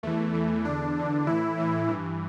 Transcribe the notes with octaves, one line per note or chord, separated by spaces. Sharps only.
E2 E3 A3
E2 E3
E2 D3 D4
E2 D3
A2 E3 E4
A2 E3
G2 E3